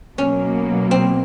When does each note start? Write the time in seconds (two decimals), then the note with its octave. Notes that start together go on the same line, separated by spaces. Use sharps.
0.17 B2 F#3 A#3 C#4
0.91 C4